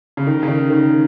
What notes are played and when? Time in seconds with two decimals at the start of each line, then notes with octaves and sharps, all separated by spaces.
0.17 C#3
0.27 D#3
0.43 C#3
0.48 D#3
0.70 D#3